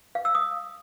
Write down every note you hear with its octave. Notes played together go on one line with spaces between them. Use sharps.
F5
E6
D#6